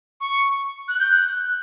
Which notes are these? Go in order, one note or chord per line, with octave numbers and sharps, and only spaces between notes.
C#6
F#6
G6
F#6